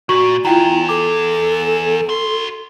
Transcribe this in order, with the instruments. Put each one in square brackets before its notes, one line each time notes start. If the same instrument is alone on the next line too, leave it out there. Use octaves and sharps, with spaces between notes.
[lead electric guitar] A#2 [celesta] F#4 C#6 F#7
[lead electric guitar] E2 [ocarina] E4 [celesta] F4 G5 A#5
[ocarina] A4 [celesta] D6
[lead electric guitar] F#4 C6